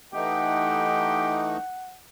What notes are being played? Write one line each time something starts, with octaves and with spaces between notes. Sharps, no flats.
E3 A3 D#4 G4 F#5